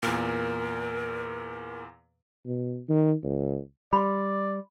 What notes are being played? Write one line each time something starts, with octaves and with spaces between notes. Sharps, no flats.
E2 A#2 A#4
B2
D#3
C#2
G3 D5 B5 C6